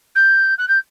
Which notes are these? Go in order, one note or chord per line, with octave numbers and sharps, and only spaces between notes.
G6
F#6
G6